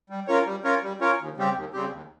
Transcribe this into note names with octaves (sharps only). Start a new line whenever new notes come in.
G3
C#4 F4 A#4 C#5
G3
C#4 F4 A#4 C#5
G3
C#4 F4 A#4 C#5
D#2
C#3 G3 C4 G4
D#2
C#3 G3 C4 G4
D#2